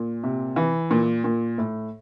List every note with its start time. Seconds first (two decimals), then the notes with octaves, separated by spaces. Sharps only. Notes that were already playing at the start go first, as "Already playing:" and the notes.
Already playing: A#2
0.24 C3
0.56 E3
0.91 A#2
1.24 A#2
1.58 A2